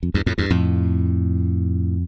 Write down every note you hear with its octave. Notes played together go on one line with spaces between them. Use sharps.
F2
E2 G2
F2 A2
E2 G2
F2 A2